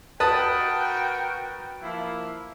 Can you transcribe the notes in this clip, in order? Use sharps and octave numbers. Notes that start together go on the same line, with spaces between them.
F#4 A#4 B4 G5 A5 D#6
F3 A#3 E4